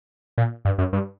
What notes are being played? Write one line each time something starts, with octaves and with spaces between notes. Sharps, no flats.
A#2
G2
F#2
G2